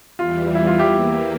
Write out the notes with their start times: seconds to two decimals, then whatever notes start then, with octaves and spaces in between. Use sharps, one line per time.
0.19 E2 E3 G3 F4
0.55 E4
0.67 F4
0.79 E4 G4
0.91 E2 E3 A#3